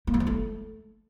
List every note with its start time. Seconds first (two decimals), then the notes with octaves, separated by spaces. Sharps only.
0.07 A#3
0.14 F#3
0.20 B3
0.27 A3